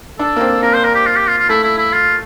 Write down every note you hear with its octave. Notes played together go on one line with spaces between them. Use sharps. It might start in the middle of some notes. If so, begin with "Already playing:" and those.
D4 A4
A#3
C4
A#3 A#4
C5
A#4
G4
F4
G4
F4
F4
A3 E4
E4
E4
F4